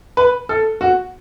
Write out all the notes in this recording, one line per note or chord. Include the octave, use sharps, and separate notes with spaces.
B4
A4
F#4